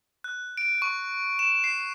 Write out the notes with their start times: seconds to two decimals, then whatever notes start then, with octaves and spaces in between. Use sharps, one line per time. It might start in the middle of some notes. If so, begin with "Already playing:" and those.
0.24 F#6
0.57 D7
0.82 C#6
1.39 E7
1.64 C7